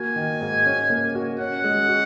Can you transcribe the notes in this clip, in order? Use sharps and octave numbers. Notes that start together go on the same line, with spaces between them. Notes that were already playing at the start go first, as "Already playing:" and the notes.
Already playing: A#3 F#4 G#5
D#3
G#2
C#4
A#3
F#4
C#4 F#5
G#3
F#4